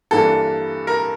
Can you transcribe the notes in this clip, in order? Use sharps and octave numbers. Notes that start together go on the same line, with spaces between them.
G2 E3 A#3 D4 A4
A#4